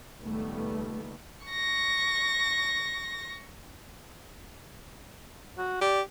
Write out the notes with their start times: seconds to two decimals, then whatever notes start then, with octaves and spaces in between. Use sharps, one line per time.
0.20 C#2 A#2 D#3 G3 A3 B3
1.46 C#6 A#6
5.58 F#4
5.81 G4 D5